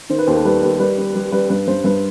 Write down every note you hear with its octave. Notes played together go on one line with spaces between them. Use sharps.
D#3 C5
B4
D#2 C5
A4
G3 B4
D#2 B4
G3 B4
G3
G3
G3 B4
G2 B4
G2 C5
G2 B4